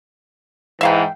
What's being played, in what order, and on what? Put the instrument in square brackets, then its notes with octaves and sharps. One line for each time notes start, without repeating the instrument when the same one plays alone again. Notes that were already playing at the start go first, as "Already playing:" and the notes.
[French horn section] G#2 E3 [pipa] E5 F5 G5